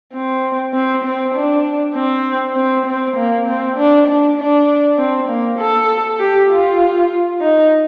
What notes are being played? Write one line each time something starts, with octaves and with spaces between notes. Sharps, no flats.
C4
C4
C4
D4
C4
C4
C4
A#3
C4
D4
D4
D4
C4
A#3
A4
G4
F4
D#4